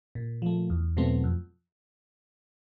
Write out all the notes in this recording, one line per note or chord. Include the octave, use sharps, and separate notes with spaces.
A#2
F3 A3
E2
B2 F#3 A3 C4
F2